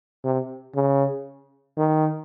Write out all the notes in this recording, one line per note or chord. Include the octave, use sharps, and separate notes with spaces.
C3
C#3
D#3